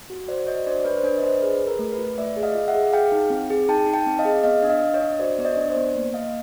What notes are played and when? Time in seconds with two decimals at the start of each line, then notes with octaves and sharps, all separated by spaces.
0.10 F#4
0.28 F#4 C5 D5
0.47 F#4 C#5 D#5
0.66 D4 C5 D5
0.79 D5
0.85 D4 B4 C#5
0.97 C5
1.03 D4 B4 C#5
1.18 D#5
1.22 D4 C5 D5
1.42 G#4 B4
1.60 G#4
1.67 A#4
1.79 A3
1.92 B4
1.98 F4
2.18 A3 D5 E5
2.36 G#4
2.43 D#5 F5
2.55 F4
2.68 E5 F#5
2.75 G#4
2.93 G#4 F5 G5
3.12 D#4
3.30 C4
3.50 G#4
3.69 D#4 G5 A5
3.87 D#4
3.94 G5 A5
4.07 C4
4.19 D#5 F5
4.25 G#4
4.44 B3 D#5 F5
4.63 D4
4.70 D#5 F5
4.82 D4
4.94 C#5 D#5
5.00 D4
5.19 F#4 C5 D5
5.38 B3 D5
5.45 C#5 D#5
5.57 D4
5.70 C5 D5
5.76 B3
5.95 A#3
6.14 A#3 D#5 F5